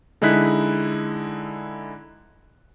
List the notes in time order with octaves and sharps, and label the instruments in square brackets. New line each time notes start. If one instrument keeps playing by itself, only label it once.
[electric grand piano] D3 G#3 D#4 E4 F#6 B6